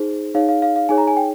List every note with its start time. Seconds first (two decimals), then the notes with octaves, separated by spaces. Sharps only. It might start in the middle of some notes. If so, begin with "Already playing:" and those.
Already playing: D#4 G#4 C5
0.34 D#4 G#4 C#5 F5
0.49 F5
0.62 F5
0.76 F5
0.89 D#4 G#4 C#5 G#5
0.98 A#5
1.07 G#5
1.17 G5